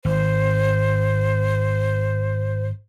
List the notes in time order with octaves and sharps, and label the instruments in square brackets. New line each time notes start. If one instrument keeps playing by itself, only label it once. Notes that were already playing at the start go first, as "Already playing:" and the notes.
[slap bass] G#1 [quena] C5